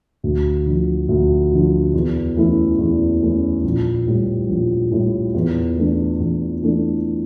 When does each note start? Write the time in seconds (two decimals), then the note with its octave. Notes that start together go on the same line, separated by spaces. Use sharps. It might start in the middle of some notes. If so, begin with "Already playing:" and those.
0.24 D2
0.66 D3 F3
1.09 D2
1.52 D3 F3
1.94 E2
2.37 E3 A3 C#4 E4
2.79 E2
3.22 E3 A3 C#4 E4
3.64 A#1
4.07 A2 G3
4.49 A#1
4.91 A2 G3
5.35 E2
5.76 E3 A3 D4
6.20 E2
6.61 E3 A3 D4